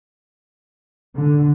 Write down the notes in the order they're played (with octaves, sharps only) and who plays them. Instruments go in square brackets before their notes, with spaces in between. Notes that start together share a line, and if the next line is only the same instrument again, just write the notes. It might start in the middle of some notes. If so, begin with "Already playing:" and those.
[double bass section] D3